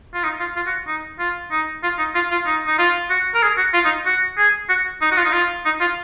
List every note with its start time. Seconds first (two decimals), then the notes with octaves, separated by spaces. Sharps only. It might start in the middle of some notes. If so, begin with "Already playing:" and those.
0.14 F4
0.24 D#4
0.40 F4
0.56 F4
0.67 F#4
0.87 D#4
1.19 F4
1.51 D#4
1.83 F4
1.99 D#4
2.15 F4
2.31 F4
2.46 D#4
2.67 D#4
2.78 F4
3.10 F#4
3.35 A#4
3.43 G#4
3.57 F#4
3.74 F4
3.85 D#4
4.06 F#4
4.37 G#4
4.69 F#4
5.01 D#4
5.11 F#4
5.17 F4
5.25 D#4
5.33 F4
5.65 D#4
5.81 F4